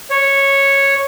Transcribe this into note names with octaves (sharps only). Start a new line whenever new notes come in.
C#5